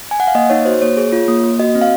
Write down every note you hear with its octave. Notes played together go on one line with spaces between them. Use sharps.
G#5
F#5
F5
A#3 D#5
D#4 C#5
F#4 C5
A#3 C#5
G#4
F4
A#3
A#3
F#4 D#5
C4
F5